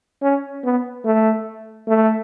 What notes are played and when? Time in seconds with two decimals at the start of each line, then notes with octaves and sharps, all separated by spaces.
0.22 C#4
0.64 B3
1.05 A3
1.88 A3